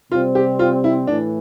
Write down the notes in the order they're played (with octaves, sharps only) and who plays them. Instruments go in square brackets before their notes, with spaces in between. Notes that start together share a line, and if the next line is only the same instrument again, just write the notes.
[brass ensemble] C3 G3 C4 [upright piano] F4
[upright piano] G4
F4
E4
[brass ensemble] A2 E3 [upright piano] D4